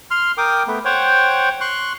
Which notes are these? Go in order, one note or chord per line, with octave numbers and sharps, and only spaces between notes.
C6 F6
A#4 G5 D6 D#6
A3 B3
C5 C#5 F#5 G5
C6 C#6 F#6